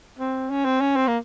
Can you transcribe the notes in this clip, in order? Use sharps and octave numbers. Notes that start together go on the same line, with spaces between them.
C4
C#4
C4
C#4
C4
A#3